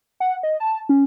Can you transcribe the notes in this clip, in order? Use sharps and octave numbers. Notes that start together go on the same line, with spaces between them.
F#5
D#5
A5
C#4